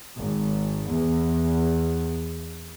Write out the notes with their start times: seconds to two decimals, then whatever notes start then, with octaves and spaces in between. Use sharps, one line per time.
0.16 G#1
0.88 E2